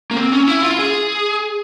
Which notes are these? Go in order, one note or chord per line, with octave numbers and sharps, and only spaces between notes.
A#3
C4
C#4
E4
F4
G#4